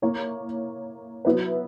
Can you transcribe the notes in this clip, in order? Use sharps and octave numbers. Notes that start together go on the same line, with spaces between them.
A#3 E4 A#4 C#5
F#3 B3 E4 B4